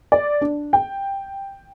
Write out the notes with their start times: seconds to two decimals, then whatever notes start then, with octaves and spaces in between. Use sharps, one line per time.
0.12 D5
0.41 D4
0.73 G5